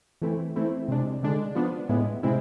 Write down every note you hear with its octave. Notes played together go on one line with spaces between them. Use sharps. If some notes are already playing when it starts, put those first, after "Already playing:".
E3 A3 C4 E4
E3 A3 C4 E4
C3 G#3 D4
D3 G#3 D4
F3 B3 D4
A2 G#3 B3 E4
C3 G#3 C4 E4